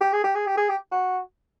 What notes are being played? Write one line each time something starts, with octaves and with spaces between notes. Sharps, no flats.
G4
G#4
G4
G#4
G4
G#4
G4
F#4